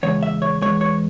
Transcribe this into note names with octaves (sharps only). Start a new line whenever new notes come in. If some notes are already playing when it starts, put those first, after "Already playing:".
E2 C#3 G#3 C#5
E5
C#5
E2 C#3 G#3 C#5
C#5